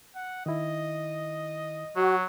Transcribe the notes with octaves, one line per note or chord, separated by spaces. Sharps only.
F#5
D#3 E4 D#5
F#3 F#4